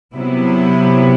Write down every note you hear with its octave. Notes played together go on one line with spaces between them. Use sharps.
C3 F#3 B3 E4